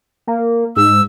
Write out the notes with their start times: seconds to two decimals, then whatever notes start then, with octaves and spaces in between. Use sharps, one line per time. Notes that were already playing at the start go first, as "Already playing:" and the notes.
0.27 A#3
0.76 G#2 E6